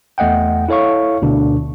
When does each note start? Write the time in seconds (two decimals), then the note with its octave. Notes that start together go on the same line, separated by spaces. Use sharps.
0.18 E2 A3 D#5 F#5 G5
0.68 E4 A4 C#5 F5 C#6
1.22 D2 B2 D3 D4